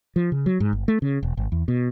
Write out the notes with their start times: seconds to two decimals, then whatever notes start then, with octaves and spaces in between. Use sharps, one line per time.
0.16 F3
0.32 C#3
0.46 F#3
0.60 G#2
0.73 G1
0.88 A3
1.02 C#3
1.23 E1
1.37 G#1
1.52 E2
1.68 B2